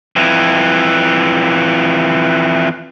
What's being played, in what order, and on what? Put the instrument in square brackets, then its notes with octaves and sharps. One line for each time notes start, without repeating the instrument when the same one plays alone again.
[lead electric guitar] F2 E3